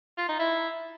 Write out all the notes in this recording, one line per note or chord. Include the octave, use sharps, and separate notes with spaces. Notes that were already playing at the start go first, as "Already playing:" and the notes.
F4
D#4
E4